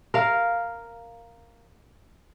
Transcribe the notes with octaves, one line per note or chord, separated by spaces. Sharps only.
A#4 F5